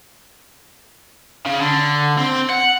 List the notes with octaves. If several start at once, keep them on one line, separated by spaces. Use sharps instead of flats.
C#3
D3
C4
F#5